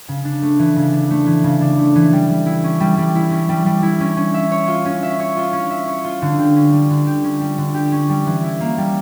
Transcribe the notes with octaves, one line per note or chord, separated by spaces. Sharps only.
C#3
D4
A3
E3
C#3
D4
A3
E3
C#3
D4
A3
E3
G3
G3
E4
C#4
G3
G3
E4
C#4
G3
G3
E4
C#4
C#4
E5
C#5
F4
C#4
E5
C#5
F4
C#4
E5
C#5
F4
D3
G4
C#4
G3
D3
G4
C#4
G3
D3
G4
C#4
G3
E3
E4
A#3
G3